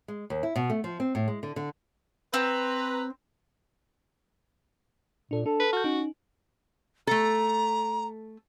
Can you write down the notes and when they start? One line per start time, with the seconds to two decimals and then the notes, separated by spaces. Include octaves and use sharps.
0.08 G#3
0.30 D#2
0.43 E4
0.56 B2
0.70 A3
0.84 F3
1.00 C4
1.15 A2
1.28 G#3
1.43 D3
1.56 D3
2.34 C4 B4 A#5
5.31 A#2 D4 A4
5.46 D4 A4
5.60 B4
5.73 F#4 F6 G6
5.84 C#4 D#4
7.07 A3 A4 A#5